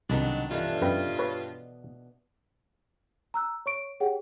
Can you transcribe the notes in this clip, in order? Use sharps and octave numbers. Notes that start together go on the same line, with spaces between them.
C2 B2 D#3 F#3 B3 D4
G2 D3 E3 D4 F4
F#2 B4 D#5 G5
B4 C#5
A#5 E6 F#6
C#5 C#6 D7
G4 G#4 C#5 F#5 G5